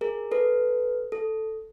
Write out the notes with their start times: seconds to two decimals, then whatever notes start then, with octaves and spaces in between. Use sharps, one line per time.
0.01 G#4 A#4
0.31 A4 B4
1.12 A4